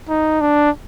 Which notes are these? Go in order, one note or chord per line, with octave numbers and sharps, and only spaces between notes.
D#4
D4